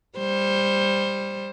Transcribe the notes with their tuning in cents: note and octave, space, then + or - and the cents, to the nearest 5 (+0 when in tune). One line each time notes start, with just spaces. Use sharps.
G3 +20 C5 +15